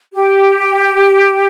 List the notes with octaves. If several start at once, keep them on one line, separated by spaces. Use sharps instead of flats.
G4